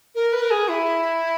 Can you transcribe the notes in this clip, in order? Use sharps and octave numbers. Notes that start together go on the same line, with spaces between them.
A#4
B4
A#4
G#4
E4